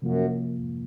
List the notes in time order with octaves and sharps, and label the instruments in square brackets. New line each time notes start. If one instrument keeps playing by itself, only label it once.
[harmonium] F#2 [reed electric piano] C3 F3 A#3 F4